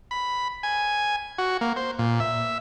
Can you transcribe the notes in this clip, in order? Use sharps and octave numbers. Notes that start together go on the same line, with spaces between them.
B5
G#5
F#4
A#3
C5
A#2
E5